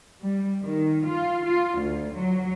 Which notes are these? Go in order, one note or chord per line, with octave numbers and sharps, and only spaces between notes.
G3
D#3
F4
F4
D2
F#3